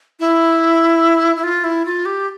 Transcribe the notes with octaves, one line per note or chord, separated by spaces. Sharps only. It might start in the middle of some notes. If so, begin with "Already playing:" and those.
E4
E4
F4
E4
F4
G4